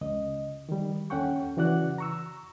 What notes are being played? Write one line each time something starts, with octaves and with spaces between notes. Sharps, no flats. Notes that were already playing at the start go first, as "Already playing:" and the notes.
C#2 D#5
D#3 G3
D#2 C#4 A4 F#5 G5 C#6
C#3 E3 F#4 D5 F#5 F#6
A#5 C#6 E6